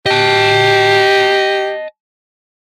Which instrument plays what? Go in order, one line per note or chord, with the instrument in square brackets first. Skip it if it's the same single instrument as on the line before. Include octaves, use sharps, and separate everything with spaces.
[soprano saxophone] G4 [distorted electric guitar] D#5 A5